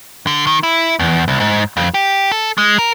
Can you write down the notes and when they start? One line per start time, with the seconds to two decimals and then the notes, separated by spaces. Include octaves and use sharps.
0.27 D3
0.47 D#3
0.63 E4
0.99 E2
1.28 C2
1.40 G#2
1.77 F2
1.94 G4
2.32 A4
2.58 G#3
2.78 A#4